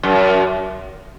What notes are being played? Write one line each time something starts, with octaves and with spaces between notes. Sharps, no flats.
F#2